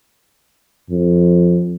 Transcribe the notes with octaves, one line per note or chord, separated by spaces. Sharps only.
F2